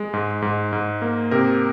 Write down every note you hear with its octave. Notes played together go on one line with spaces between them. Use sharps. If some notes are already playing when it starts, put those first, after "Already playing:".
Already playing: G#3
G#2
G#2
G#2
A#3
C3 A#4